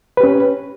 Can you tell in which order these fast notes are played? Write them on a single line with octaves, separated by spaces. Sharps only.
B4 G4 C#4